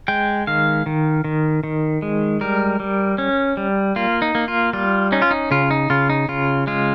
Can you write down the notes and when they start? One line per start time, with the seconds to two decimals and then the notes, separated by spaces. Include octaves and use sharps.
0.08 G#3 G5
0.47 D#3 F5
0.86 D#3
1.24 D#3
1.64 D#3
2.02 G#3
2.41 G3 A#4
2.80 G3
3.18 C#4
3.57 G3
3.96 A#3 F4
4.22 D#4
4.35 A#3
4.48 F4
4.73 G3 F4
5.12 C#4 D#4
5.22 F4
5.31 D#4
5.51 C#3 F4
5.71 D#4
5.90 C#3 F4
6.10 D#4
6.28 C#3 F4
6.67 G#3 F4